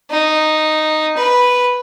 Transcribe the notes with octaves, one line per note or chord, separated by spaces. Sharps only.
D#4
B4